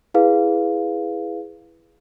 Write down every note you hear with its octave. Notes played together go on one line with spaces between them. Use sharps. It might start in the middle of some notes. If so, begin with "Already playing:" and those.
E4 G#4 B4 F5